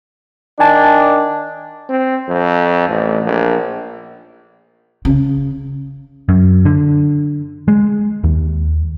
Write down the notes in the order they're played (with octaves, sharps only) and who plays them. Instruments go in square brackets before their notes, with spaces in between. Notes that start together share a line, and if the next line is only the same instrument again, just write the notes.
[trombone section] D#3 D4 [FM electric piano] G#5 A5
[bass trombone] C4
F2
A1
A#1
[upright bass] C#3
[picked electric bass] F#2
D3
G#3
D#2